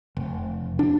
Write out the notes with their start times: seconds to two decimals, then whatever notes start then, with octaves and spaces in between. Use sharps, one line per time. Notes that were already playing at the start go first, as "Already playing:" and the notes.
0.17 F1
0.79 D4